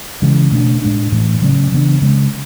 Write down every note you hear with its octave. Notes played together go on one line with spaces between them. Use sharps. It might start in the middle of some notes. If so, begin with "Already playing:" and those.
C#3 E3 G#3
B2 A3 D4
A2 G#3 D4
A2 E3 A3
C#3 F#3 A3 C#4
C#3 E3 B3 D4
C#3 G#3 C#4